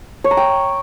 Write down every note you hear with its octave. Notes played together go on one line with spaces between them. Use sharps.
C#5
A#5
G5